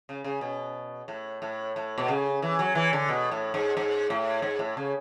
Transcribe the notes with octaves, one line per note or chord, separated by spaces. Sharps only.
C#3
C#3
B2
A2
A2
A2
B2
C#3
E3
F#3
E3
D3
B2
A2
G#2
G#2
A2
G#2
A2
C#3